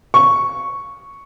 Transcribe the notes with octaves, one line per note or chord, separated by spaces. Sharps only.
C#6